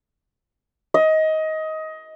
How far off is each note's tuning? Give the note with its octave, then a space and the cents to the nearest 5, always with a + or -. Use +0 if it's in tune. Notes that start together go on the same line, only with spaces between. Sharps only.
D#5 +20